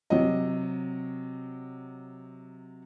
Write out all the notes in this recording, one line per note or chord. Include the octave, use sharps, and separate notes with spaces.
C3 F#3 D#5